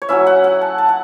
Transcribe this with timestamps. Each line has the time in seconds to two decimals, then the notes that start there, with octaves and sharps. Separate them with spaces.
0.02 C#5
0.09 F#3 C#4 E4 E5
0.27 F#5
0.44 F#5
0.61 A5
0.78 A5
0.89 F#5